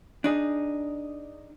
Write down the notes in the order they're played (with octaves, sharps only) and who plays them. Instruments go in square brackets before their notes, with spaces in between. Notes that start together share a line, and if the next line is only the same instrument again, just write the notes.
[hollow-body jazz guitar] D4 D#4 G#4